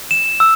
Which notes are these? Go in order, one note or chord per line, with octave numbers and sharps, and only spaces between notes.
E7
E6